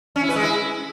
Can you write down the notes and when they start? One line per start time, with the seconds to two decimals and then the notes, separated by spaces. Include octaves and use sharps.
0.16 C#4
0.22 E4
0.29 B4
0.36 G#3
0.42 E4